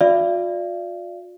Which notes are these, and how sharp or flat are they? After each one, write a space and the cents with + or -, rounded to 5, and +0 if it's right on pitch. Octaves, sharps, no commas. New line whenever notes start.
F4 +40 D5 +0 F5 -45